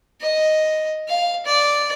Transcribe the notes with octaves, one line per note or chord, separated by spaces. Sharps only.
D#5
F5
D5